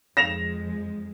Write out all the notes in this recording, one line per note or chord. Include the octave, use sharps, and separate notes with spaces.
F2 G#3 A#6 E7 F7